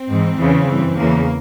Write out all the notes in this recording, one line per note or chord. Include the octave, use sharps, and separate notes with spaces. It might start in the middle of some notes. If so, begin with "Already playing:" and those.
Already playing: C4
G#2 E3
E2 C#3 E3
G2 E3
E2 C#3 E3 A#3